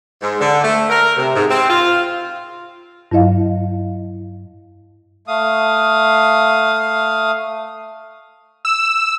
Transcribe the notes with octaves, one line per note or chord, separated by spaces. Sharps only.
G#2
D3
A3
A#4
C3
G#2
C4
F4
G2 F#3 E4 D#5 F5
A3 F5 D#6
E6